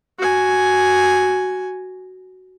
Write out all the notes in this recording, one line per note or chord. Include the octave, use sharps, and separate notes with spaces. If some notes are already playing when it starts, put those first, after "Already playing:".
F#4 G#5